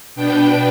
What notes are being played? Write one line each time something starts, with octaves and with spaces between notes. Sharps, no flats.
B2 B3 D4 G5